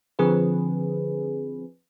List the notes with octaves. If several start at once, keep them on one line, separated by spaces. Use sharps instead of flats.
D3 F3 C4 G#4 B4